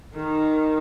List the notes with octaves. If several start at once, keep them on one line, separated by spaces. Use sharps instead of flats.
D#3